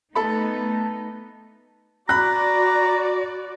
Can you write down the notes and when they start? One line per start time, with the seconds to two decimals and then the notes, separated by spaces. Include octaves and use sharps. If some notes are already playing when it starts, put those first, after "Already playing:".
0.15 A3 B3 D#4 A4 B5
2.09 F#4 D5 A#5 B5 F#6